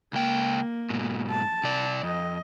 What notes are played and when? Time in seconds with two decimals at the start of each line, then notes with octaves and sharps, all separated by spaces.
0.13 C#2 A#3 G5
0.90 G#2 B2
1.30 A5
1.64 C3 D5
2.03 F2 D#5